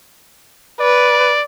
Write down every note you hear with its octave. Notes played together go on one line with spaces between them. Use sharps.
B4 D5